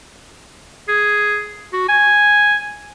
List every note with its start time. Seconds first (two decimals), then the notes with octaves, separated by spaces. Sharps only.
0.88 G#4
1.73 F#4
1.88 G#5